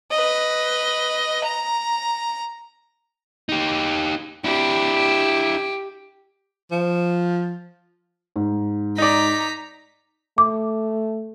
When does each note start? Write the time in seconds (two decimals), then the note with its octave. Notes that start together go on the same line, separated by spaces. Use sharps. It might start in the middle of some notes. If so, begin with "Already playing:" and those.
0.11 B4 D#5
1.43 A#5
3.49 D#4 G4
4.44 D4 E4 G4
6.71 F3
8.36 G#2
8.98 D#4 D5 A#5 B6
10.38 A3 D6